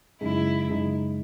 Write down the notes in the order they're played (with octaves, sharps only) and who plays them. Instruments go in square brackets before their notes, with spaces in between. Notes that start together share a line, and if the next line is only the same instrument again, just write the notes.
[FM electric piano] F#2 C#3 G#3 D#4 [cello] E4
[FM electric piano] F#2 C#3 G#3 D#4